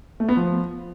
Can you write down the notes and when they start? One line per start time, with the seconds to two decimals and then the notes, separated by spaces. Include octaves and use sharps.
0.20 A3
0.29 B3
0.37 F3